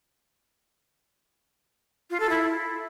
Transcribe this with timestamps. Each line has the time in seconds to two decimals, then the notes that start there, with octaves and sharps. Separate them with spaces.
2.10 F4
2.20 A4
2.30 E4